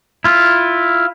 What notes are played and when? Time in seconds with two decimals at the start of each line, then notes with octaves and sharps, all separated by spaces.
0.24 E4 F4